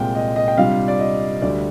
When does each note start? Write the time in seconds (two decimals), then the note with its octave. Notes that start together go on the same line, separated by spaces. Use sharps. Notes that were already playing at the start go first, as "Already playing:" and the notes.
Already playing: C2 A#2 G#3 C4 G5
0.15 D#5
0.36 D#5
0.48 G5
0.57 C3 G3 D4 F4 F5
0.88 D5
0.99 D#5
1.42 D2 D3 G3 D5